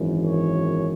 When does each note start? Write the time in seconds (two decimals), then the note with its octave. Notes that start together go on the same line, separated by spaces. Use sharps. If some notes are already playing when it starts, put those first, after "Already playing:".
Already playing: G#1 F#2 E3
0.25 C#5